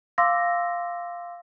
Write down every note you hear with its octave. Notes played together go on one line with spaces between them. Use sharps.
F5 C6 D6 E6 A#6